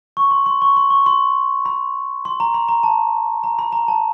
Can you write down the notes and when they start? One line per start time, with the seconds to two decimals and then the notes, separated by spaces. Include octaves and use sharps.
0.17 C#6
0.31 C6
0.46 C6
0.62 C#6
0.77 C6
0.90 C#6
1.06 C6
1.65 B5
2.25 C6
2.40 A#5
2.54 B5
2.69 A#5
2.83 A5
3.44 A#5
3.59 B5
3.72 A#5
3.88 A5